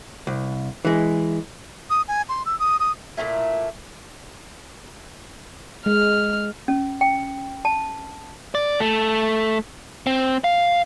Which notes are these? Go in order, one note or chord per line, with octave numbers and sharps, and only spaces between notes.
C2
E3 G#3
D#6
G#5
C6
E6
D#6
D#6
A#2 A3 D#4 E4
G#3 F6
C#4
G5
A5
D5
A3
C4
F5